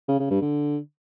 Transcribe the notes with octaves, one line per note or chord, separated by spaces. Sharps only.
C#3
C#3
G2
D3